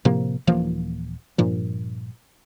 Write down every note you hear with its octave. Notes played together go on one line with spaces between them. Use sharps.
A2 C3 F3 A#3
D#1 E3 F3 A#3
G2 A#2 F3